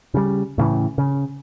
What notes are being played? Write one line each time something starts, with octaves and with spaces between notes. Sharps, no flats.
C#3 G3
A2 C#3 E3
C#3